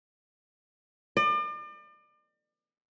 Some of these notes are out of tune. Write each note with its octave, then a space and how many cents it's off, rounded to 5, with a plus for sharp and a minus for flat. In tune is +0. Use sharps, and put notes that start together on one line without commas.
D5 +40